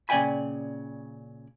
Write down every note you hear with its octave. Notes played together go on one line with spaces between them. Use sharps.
A#2 C#3 D5 G5 G#5 B5